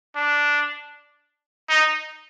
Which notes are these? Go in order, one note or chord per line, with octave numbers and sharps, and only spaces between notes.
D4
D#4